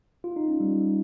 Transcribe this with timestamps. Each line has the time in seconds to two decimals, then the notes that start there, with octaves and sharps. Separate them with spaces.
0.24 F4
0.36 D#4
0.48 C#4
0.60 G3